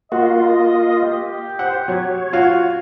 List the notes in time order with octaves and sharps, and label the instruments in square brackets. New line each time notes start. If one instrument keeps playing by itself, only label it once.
[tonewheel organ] A#3 F4 [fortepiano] F#4 [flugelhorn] D#5
[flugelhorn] G4
[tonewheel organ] C5 [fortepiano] F#5
[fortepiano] F#3 [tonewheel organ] C#5
[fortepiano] F4 F#4 F5